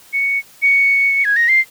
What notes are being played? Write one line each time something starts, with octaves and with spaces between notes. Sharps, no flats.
C#7
C#7
G#6
A#6
C7